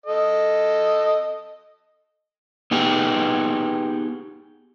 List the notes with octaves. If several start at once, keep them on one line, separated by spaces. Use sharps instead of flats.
A4 D#5
B3 D#4 G4 G#4